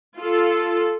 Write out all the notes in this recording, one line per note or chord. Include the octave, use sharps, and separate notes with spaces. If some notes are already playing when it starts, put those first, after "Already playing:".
F4 A4